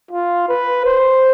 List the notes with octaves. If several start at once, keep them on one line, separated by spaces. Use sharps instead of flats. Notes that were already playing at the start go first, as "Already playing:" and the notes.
F4
B4
C5